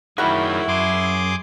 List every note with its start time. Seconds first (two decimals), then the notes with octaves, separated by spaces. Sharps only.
0.18 F#2 D#3 G3 E4 F#4 G#4 A#4 E5
0.68 F#2 G#4 C6 D6